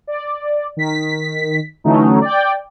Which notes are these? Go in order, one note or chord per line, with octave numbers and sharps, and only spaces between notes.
D5
D#3 B6
D3 E3 F#3 A3 C#4 D#4
D5 G5